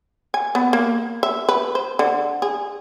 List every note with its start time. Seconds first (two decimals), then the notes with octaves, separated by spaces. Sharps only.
0.34 G#5
0.55 B3
0.73 A#3
1.23 E5
1.49 B4
1.75 C5
1.99 D3
2.42 G#4